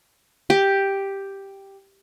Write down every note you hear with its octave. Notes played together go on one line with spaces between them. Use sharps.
G4